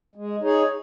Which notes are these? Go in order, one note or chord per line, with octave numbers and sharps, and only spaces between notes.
G#3
D#4 G#4 C#5